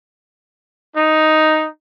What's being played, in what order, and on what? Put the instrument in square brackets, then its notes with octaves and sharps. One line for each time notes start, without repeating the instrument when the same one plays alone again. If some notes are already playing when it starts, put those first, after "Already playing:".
[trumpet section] D#4